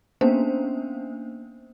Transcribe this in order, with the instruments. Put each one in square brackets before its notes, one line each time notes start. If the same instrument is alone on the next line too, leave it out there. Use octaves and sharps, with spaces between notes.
[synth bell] A#3 B3 C#4 D4 C5